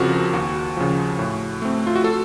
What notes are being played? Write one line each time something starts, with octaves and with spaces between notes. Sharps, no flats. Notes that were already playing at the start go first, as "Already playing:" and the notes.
Already playing: F2 C#3 F3 C4 F#4 A#4
D#2 F#4
C#3 F3
A2
A3 C4
F4
F#4
A4